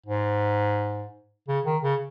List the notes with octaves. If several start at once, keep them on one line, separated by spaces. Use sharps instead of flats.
G#2
C#3
D#3
C#3